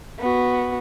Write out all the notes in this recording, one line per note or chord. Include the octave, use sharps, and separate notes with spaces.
B3 F#4